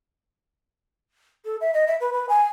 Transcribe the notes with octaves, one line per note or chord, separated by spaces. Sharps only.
A4
E5
D#5
E5
B4
B4
G#5